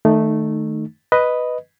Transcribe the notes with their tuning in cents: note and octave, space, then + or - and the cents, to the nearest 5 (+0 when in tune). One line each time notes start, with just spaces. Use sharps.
D#3 +0 A3 +0 D#4 -25
B4 +0 D#5 +0